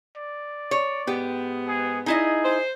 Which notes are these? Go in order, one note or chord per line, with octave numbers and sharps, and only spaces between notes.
D5
C#5
G#2 B3 G4
G#4
D#4 E4 G#4 D#5
C5